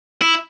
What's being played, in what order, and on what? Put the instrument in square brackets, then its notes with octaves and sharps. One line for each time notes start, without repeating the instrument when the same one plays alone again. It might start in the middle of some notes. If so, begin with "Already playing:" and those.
[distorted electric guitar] E4